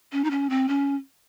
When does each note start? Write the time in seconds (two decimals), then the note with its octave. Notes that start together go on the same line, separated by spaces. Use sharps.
0.12 C#4
0.24 D#4
0.31 C#4
0.50 C4
0.69 C#4